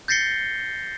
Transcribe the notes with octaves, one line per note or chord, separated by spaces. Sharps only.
G6 A6 A#6 C7 C#7 G7